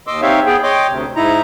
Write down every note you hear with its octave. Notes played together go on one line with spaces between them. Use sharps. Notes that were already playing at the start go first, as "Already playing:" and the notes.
D#2 D#5 C6 D6 E6
C4 D#4 G4 C#5 E5 F5
B3 G#4 G5
C#5 D#5 G5 C6 D6
D2 C3
G#2 D#4 E4 A#5